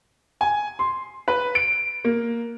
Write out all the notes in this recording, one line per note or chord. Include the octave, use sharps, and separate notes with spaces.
G#5
C6
B4
D7
A#3